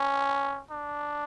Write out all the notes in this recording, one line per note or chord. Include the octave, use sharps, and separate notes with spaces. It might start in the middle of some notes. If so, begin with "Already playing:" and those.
Already playing: C#4
D4